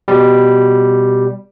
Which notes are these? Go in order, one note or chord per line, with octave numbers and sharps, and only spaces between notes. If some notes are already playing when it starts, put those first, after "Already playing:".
B2 G3